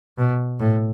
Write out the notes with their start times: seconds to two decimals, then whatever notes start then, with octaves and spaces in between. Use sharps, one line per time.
0.18 B2
0.60 A2